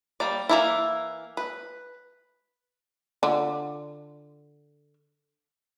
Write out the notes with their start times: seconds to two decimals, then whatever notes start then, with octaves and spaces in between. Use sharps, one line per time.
0.20 G3 A#3 D5
0.49 E3 A#3 E4
1.37 B4
3.23 D3 F4